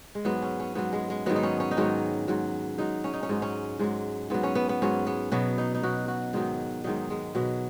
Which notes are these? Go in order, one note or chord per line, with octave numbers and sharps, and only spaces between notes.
G#3
G#2 F#3 B3
C#4
C#4
G#2 F#3 B3
G#3
G#3
G#2 D#3 F#3 B3
D#4
C#4
C#4
D#4
G#2 D#3 F#3 C#4
G#2 F#3
G#2 F#3 D#4
C#4
D#4
C#4
G#2 F#3 D#4
C#4
G#2 F#3 G#3
G#2 F#3 B3
C#4
B3
B3
G#2 F#3 C#4
B3
B2 F#3 B3
D#4
D#4
B2 F#3 F#4
F#4
G#2 D#3 F#3 D#4
G#2 D#3 F#3 D#4
G#3
B2 F#3